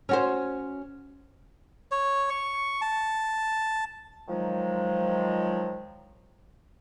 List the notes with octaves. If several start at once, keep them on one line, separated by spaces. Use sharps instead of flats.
C#4 F#4 C5
C#5
C#6
A5
D#3 F3 F#3 G#3